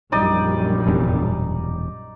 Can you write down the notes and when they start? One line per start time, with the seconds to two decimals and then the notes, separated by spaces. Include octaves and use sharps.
0.12 A#1 F#2 G3 D#4 D5 D#6
0.87 F1 E2 G2
1.21 E1